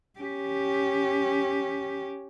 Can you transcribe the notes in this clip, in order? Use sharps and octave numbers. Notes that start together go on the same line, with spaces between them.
C#4 G4